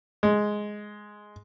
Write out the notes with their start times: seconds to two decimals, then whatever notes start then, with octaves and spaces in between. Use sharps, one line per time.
0.23 G#3